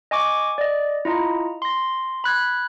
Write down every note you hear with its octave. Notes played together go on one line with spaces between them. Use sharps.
D#5 G#5 C#6 D6
D5 D#5
E4 F4 D#5 A#5
C6 A#6
B5 F#6 G#6